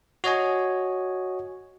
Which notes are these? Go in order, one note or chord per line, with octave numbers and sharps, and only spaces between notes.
F#4 C#5 D#5 G#5